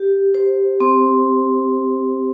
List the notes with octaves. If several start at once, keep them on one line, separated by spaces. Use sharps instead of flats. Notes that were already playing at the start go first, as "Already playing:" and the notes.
Already playing: G4
C5
C4